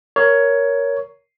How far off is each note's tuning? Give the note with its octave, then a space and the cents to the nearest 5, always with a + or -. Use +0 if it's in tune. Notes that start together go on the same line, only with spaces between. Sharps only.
A#4 +0 C#5 +10